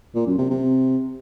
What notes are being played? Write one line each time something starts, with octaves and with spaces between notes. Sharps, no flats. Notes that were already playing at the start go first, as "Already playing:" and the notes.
A#2
F#2
C3
C3